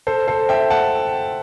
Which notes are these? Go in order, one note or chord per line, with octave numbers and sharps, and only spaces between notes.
A4 C5
A4 C5
E5 G5
F#5 A5